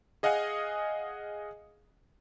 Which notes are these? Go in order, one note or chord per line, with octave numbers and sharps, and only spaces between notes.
G#4 D#5 F5 F#5 G#5